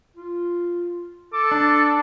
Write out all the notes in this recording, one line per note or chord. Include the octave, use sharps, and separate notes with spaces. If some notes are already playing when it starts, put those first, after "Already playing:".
F4
A4 D6
D4